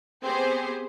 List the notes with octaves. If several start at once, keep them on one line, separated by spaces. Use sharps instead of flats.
B3 C4 G4 G#4 C5